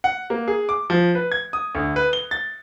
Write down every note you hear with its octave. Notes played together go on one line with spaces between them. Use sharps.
F#5
A#3
G#4
D6
F3
B4
G#6
D#6
D2
B4
G7
A6